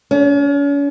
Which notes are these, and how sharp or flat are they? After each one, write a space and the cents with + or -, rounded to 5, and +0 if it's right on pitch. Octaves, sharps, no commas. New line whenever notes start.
C#4 +40